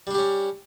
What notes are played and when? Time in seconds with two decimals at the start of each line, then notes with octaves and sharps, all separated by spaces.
0.07 G3
0.11 D4
0.15 G4
0.18 C#4